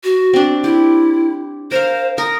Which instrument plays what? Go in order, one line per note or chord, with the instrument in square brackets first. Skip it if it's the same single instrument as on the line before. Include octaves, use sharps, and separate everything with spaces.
[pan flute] F#4
[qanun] C4 D4
[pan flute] E4 [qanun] G4
[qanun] A#4 F5 [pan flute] C5
[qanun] A#4 [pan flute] D#6